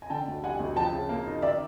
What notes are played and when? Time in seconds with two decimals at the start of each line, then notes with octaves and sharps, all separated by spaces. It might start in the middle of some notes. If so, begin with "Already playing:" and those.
0.02 G#5
0.10 D3 G5 A5
0.27 D2
0.43 G3 F#5 G#5
0.59 D2
0.76 F3 G5 A5
0.92 C#3
1.09 A#3
1.26 D#4
1.42 D#3 D5 E5